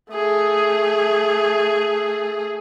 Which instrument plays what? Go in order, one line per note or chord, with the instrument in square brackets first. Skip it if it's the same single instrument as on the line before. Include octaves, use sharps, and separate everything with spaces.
[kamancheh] A3 G#4